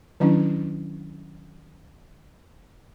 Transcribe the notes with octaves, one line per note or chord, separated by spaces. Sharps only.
D#3 F#3 C#4 D4 E4